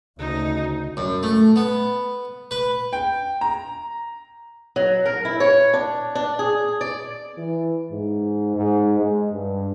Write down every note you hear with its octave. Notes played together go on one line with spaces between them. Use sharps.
D2 C#3 D#4
F#2
A3
B3
B4
G5
A#5
F#3
A#4
E4
C#5
D4
D4
G#4
D5
E3
G#2
G#2
G#3
G2